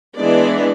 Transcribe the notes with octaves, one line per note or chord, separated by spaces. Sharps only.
E3 G#3 B3 D4 D5